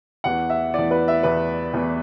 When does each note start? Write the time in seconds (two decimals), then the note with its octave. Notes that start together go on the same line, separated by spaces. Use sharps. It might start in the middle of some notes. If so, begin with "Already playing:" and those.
0.24 E2 E3 F#5
0.50 E5
0.74 E2 E3 D5
0.91 B4
1.08 E5
1.23 E2 E3 B4
1.74 E2 E3